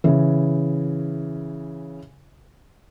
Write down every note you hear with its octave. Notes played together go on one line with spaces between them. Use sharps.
C#3 E3